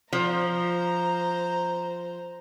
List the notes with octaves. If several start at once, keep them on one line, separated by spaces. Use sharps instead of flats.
F3 C5 A#5